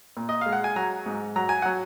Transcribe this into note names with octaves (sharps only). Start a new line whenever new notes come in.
A#2
D#5
G#3 F5
F#5
G#5
F#3 A#5
G#2
F#3 A#5
G#5
F#3 F#5